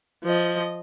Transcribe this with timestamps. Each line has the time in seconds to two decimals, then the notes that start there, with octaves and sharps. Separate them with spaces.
0.24 F3 D#5